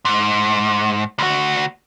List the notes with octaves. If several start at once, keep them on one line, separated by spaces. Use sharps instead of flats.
G#2
D2 F#4